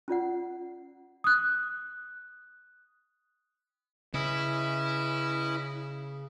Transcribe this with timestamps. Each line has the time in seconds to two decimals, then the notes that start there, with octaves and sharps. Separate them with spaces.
0.08 C#4 F4 D5 F#5
1.24 D#6 F#6
4.14 C#3 C#4 E4 B4 D#5